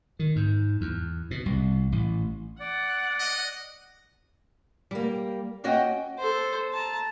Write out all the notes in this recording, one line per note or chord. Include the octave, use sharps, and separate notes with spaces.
D#3
G#2
E2
B2
C2
A1
D5 F#5
D#5
G3 A#3
A#3 C#4 F#4 D#5 F#5 G5
A4 C5
A5 A#5